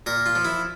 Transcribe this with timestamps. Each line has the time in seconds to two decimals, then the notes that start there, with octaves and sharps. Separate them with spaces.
0.06 A#2 A#4
0.26 F4
0.35 F3
0.45 E4